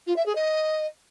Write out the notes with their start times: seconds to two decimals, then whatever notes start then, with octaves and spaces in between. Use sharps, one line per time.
0.06 F4
0.16 E5
0.25 G#4
0.35 D#5